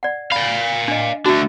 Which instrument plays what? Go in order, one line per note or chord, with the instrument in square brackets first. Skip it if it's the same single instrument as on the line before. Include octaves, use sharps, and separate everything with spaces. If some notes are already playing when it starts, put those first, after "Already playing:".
[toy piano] D5 F#5
[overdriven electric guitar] D5 F5 [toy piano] B5
[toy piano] D4 D#5
[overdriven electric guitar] A3 D4 [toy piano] F#4